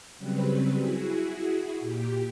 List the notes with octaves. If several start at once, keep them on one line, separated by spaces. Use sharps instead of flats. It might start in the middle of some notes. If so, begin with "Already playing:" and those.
C#3 F#3 G3 C4 B4
E4 F#4 G#4
A#2 G4